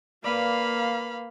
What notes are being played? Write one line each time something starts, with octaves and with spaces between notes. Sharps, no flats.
A#3 B4 D5 F5 B5